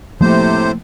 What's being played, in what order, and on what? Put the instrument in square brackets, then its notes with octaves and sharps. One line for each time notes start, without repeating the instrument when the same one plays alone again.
[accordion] A2 C3 C5 [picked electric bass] F3 A3 A#3